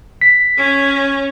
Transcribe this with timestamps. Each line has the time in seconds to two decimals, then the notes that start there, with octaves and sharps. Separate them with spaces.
0.21 B6
0.58 C#4